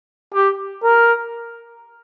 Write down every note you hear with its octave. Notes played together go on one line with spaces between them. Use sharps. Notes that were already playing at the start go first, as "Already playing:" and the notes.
G4
A#4